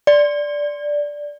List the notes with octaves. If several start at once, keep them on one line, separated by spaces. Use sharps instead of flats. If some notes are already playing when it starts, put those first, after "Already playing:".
D5